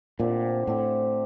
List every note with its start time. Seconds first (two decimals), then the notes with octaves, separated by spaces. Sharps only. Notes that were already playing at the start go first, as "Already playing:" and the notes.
0.19 A#2 D3 A3 C4 G4
0.67 A2 D3 A3 C4 G4